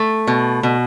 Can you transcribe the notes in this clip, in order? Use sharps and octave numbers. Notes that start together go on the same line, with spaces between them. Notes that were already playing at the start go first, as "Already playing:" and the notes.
Already playing: A3
B2
B2